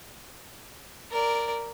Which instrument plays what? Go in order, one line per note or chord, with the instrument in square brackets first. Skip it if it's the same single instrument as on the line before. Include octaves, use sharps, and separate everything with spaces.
[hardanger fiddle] A#4 D5